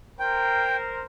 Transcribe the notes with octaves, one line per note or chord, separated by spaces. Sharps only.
A#4 C5 G5